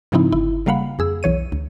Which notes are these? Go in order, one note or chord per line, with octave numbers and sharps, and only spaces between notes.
G#2 C#3 F3 C4 D#4 E4
G1 E4
C#3 G3 A#3 F5 F#5 B5
F2 G#4 E6
B1 E3 C#5 D#7
D2